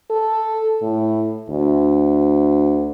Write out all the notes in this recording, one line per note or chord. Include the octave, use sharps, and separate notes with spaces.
A4
A2
D2